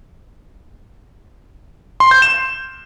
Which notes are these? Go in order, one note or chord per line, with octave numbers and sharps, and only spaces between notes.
C6
G6
E7